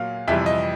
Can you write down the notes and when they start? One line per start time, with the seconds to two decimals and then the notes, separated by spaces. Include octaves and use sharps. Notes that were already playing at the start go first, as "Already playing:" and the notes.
Already playing: A#2 F#3 F5
0.28 F2 C3 E3 G3 E5
0.46 D#5